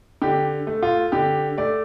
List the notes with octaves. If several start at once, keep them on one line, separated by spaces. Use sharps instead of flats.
D3 G4
A3
F4
D3 G4
A3 D5